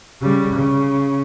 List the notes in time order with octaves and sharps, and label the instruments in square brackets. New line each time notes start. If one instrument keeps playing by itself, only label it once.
[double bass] C#3 G3
C#3